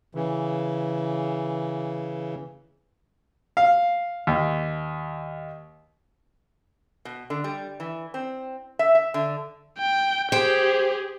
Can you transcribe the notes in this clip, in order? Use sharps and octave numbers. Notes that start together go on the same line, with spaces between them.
C#3 E3
F5
D#2
B2
D3
G3
E3
C4
E5
E5
D3
G5
G4 G#4 C5 G5